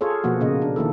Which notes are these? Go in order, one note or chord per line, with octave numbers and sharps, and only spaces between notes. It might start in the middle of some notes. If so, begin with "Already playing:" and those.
F4 G#4 A4 C#5
B2 F3 A#3 F#4
A#2 C#3 A#3 D#5
D4
D#3 A#3 E4 A4